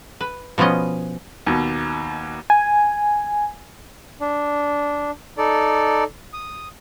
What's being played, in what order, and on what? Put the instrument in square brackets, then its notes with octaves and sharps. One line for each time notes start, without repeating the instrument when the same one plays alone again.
[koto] B4
B2 F3 B3 C#4 D#5
[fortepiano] D#2 B2
[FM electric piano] G#5
[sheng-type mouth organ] D4
D#4 A4 D5
D#6